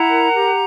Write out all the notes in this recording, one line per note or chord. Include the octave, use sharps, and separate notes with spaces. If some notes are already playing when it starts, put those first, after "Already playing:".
Already playing: E4 F#5 A#5
A#4
G4